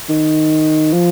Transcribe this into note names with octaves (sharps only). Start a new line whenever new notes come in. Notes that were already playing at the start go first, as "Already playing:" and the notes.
D#3
F3